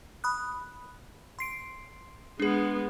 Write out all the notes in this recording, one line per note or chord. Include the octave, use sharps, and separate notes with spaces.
B5 D#6 F#6
C6 C7 D7
G#3 B3 D4 G#4